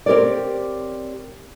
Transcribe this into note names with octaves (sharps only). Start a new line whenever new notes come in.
C4 G4 A#4 C#5 D5